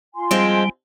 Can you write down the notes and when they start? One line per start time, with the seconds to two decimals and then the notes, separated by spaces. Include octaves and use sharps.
0.15 F4 G#5 C6
0.31 F3 G3 G#3 C4